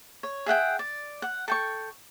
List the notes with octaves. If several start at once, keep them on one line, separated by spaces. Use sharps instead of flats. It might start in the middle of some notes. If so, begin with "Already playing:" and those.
C#5
G#4 E5 F#5 G5
D5
F#5
A4 G5 C#6